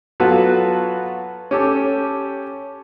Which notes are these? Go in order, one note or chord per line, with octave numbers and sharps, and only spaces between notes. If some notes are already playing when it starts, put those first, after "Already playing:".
F#3 B3 F4 F#4 A4 B4
C#4 G4 A4